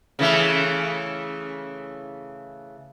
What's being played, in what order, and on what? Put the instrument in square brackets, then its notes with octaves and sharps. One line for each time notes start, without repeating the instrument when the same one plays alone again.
[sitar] C#3 E3 A3